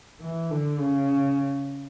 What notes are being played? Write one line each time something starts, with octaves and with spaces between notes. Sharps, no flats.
E3
D3
C#3